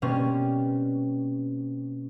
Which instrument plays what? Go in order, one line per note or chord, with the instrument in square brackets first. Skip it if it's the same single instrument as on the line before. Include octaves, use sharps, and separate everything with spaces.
[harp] B2 G3 A#3 C4 C#4